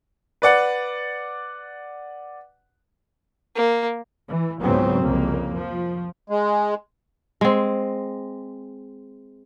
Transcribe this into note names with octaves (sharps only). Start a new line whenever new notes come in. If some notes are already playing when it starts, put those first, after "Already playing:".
B4 D5 F#5
A#3
E3
C#2 G#2 C#3 F#3 B3 C4
C2 F2 C#3 A#3
F3
G#3
G#3 C4